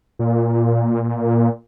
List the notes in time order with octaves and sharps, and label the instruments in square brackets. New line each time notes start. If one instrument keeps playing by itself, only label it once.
[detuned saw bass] A#2